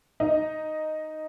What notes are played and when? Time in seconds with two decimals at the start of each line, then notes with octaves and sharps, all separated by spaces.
0.20 D#4